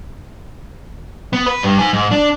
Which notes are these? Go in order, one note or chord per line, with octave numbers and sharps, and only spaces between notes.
B3
B4
G2
D#4 G#5
G#2
D4